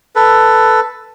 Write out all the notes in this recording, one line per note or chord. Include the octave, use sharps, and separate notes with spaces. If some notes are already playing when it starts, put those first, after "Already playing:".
A4 B4